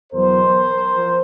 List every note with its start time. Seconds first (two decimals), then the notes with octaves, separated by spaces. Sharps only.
0.12 E2 B2 F#3 A#4 C5
0.94 F3